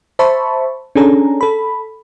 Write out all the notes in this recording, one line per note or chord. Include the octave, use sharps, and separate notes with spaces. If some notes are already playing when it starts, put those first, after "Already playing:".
C5 E5 A5 B5 C#6
C#4 D4 G#4 A4 A#5
A4 B5